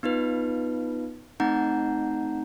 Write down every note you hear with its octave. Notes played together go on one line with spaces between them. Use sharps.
B3 D#4 F4 B4
A3 C4 D#4 F#5 A#5 G6